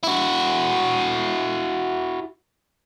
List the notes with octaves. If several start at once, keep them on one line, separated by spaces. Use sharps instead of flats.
E4 F#4